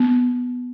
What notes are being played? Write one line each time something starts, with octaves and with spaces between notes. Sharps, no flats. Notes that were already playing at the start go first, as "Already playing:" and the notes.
Already playing: B3